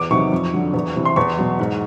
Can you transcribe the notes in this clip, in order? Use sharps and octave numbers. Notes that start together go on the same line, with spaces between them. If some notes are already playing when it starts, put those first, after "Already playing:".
Already playing: E2 D6
C3 D#3 F#3 C#6
F2
D3 F#3
E2
C3 E3
C6
E2 C#6
B2 F#3
G#2